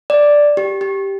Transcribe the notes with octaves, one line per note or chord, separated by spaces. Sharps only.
D5
G4
G4